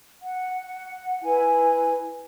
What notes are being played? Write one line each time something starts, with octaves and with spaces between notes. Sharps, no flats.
F#5
E4 B4 G#5